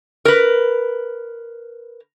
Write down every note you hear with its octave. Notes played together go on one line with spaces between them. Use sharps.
A#4 B4